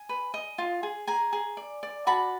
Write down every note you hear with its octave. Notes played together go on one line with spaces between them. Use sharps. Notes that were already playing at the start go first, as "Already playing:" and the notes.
Already playing: G#5
B4
D#5
F4
G#4
G#4 G#5 A#5
G#4
D5
D5
F#4 A5 B5